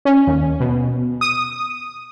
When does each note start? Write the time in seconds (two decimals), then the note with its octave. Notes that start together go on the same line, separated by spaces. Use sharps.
0.05 C#4
0.27 D#2
0.60 B2
1.21 D#6